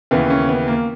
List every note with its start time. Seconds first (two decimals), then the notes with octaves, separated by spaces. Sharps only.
0.11 D#2 C#3 E3 B3
0.30 C#4
0.49 B3
0.68 A#3